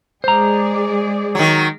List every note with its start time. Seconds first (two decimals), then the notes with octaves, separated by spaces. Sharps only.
0.24 G#3 G#4 C5 D5 A#5
1.35 D#3 F#3